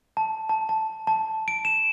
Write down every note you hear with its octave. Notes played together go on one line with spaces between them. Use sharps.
A5
A5
A5
A5
D7
E7